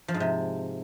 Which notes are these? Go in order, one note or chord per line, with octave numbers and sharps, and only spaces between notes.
F3
G#2
C3